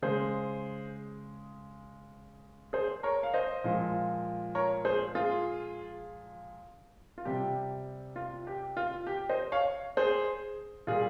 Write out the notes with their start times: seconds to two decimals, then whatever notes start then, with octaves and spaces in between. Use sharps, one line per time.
0.02 C#3 G#3 G#4 C5
2.73 G#4 C5
3.03 A#4 C#5
3.23 F5
3.33 C5 D#5
3.64 A#2 F3 G#3
4.55 A#4 C#5
4.85 G#4 C5
5.15 F4 G#4
7.18 F4
7.25 C3 G3 G4
8.16 F4
8.47 G4
8.77 F4
9.07 G4
9.29 C5 D#5
9.52 C#5 F5
9.97 G#4 C5
10.87 A#2 G3 F4 G#4